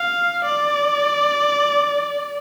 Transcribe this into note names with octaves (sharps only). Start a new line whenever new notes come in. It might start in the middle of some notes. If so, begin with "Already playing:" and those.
Already playing: F5
D5